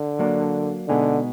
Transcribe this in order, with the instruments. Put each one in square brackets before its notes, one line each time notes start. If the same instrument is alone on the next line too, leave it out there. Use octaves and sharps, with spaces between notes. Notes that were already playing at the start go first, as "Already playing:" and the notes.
Already playing: [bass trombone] D3
[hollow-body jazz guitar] F#3 A#3 D4
[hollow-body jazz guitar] B2 G#3 B3 D#4 G#4 [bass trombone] D3